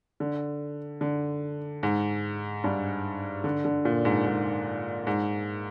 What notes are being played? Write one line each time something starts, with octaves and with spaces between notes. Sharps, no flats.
D3
D3
G#2
G2
D3
D3
A#2
G#2
G#2
G#2